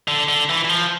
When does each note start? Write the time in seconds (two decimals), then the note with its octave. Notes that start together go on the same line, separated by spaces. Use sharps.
0.08 D3
0.29 D3
0.50 E3
0.65 E3
0.69 F3